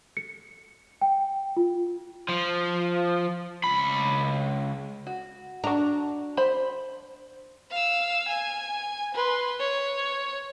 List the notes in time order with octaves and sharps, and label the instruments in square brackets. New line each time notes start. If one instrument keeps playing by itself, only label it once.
[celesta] C#7
G5
F4
[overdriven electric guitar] F3
C#2 B5
[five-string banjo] F#4
[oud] D4 [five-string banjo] F#4 A#5
[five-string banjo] C5 B5
[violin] F5 E6
G#5
B4 C6
C#5